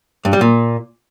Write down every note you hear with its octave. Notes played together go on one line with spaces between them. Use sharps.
G2
G3
A#2